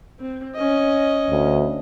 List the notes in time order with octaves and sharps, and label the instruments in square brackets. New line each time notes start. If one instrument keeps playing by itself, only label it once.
[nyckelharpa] C4
C#4 D#5
[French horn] D2